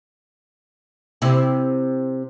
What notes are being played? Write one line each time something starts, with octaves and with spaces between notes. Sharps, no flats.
C3 E4